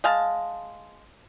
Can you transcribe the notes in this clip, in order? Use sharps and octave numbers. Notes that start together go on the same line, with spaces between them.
G#3 F5 A5